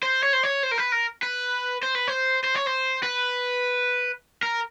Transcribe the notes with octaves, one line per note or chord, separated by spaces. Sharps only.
C5
C#5
C5
C#5
C5
A#4
B4
A#4
B4
C5
B4
C5
C5
C#5
C5
B4
A#4